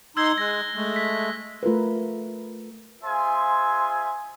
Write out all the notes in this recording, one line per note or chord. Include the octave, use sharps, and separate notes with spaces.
D#4 C6 E6 G#6 G7
G#3 F#6 A#6
G#3 A3
B6
A3 F4 A#4 B4
F4 G#4 C5 E5 G#5 C6